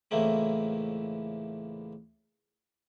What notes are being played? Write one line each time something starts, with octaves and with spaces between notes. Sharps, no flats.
C#2 A2 E3 A3 A#3 C4